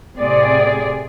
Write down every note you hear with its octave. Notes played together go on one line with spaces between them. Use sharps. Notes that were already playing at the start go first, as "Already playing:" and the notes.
A2 C3 G#4 D5